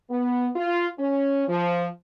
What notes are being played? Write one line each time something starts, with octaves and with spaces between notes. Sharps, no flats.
B3
F4
C#4
F3